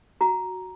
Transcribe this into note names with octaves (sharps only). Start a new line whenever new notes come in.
F#4 A#5